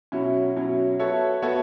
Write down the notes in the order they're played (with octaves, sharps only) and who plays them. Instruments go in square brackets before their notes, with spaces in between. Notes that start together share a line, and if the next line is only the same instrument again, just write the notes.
[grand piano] B2 F#3 C#4 E4
B2 F#3 C#4 E4
B3 F#4 A4 C#5 E5
B3 F#4 A4 C#5 E5